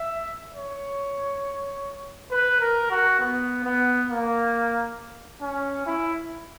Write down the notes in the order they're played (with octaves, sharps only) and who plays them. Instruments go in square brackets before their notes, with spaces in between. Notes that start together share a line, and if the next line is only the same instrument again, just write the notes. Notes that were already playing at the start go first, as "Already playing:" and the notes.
Already playing: [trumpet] E5
C#5
B4
A#4
F#4
B3
B3
A#3
C#4
E4